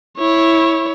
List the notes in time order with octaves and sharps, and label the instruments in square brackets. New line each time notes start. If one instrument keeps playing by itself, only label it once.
[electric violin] E4 C#5